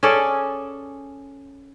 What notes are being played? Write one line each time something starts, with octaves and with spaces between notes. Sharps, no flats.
C#4 G#4 A4 D5